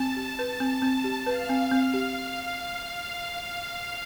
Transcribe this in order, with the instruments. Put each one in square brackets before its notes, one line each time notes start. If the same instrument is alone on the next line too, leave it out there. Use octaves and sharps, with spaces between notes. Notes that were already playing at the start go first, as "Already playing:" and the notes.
Already playing: [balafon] C4 [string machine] A5
[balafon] G4
[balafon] B4 [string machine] A5
[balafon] C4
C4
G4
[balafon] B4 [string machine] F5
[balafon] C4
C4
G4